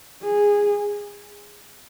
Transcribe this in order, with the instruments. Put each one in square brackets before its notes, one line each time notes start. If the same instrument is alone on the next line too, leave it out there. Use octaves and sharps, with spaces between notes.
[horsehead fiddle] G#4